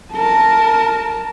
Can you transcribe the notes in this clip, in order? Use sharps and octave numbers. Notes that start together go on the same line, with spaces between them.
A#4 A5